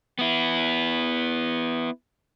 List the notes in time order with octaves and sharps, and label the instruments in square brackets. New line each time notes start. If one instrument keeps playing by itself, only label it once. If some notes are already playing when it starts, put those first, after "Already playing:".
[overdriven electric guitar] B3 E4